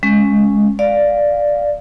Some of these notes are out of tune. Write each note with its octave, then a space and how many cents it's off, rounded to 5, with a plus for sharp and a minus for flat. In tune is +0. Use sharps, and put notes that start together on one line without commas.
G#3 +0 C#4 +0
D5 +0 F5 +0